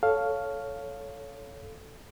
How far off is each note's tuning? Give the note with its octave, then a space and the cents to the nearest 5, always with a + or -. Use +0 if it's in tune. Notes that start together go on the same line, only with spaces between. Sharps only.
A4 +0 C#5 +10 F5 +0